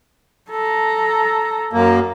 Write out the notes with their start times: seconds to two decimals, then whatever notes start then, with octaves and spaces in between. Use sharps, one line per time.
0.51 A4 A#5
1.73 F#2 A#3